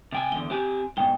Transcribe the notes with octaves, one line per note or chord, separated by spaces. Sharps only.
C3 G5 G#5
E2 D3 G7
C4 G4 G#5
G#2 B2 G5 G7